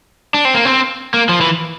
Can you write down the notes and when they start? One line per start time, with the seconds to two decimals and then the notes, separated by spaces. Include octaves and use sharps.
0.34 D4
0.45 C4
0.54 A#3
0.65 C4
1.14 A#3
1.29 F3
1.41 E3